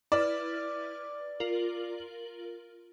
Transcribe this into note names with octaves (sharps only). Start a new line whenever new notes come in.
E4 B4 D5 F6
F4 A#4 F#7